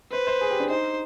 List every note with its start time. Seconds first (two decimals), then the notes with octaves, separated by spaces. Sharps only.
0.12 B4 C5
0.27 C5
0.41 G#4
0.51 G4
0.60 D4
0.70 D#4 C5